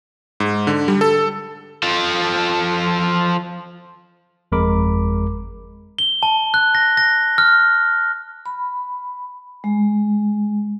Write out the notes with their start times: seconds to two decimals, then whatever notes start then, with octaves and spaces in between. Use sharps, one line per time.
0.40 G#2
0.67 D3
0.88 G3
1.01 A4
1.83 F3 A4
4.52 G1 F2 G#3 A#4 B5 D6
5.99 G7
6.23 A5
6.54 F#6
6.75 A#6
6.97 A#6
7.38 F6
8.46 B5
9.64 G#3